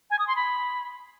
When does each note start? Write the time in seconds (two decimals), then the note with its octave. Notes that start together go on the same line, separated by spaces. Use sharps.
0.10 G#5
0.19 D#6
0.28 C6
0.36 B5